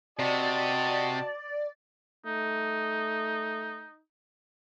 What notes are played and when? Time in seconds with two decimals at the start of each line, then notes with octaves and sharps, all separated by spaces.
0.19 C3 F#4 D5 D#5 A5
2.26 A3 D#4